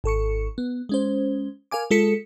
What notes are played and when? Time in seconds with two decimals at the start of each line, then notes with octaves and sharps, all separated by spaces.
0.04 G#1 A4 C#6 C#7
0.58 B3
0.89 G#3 C#4 C5
1.71 A#4 F5 G#5 D6
1.91 G#3 F4 A4 B6 C#7